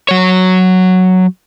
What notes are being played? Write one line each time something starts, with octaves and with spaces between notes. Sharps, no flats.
F#3 C#5